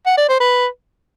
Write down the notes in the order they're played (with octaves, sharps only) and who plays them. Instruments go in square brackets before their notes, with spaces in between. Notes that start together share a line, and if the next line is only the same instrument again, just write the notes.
[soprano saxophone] F#5
D5
C5
B4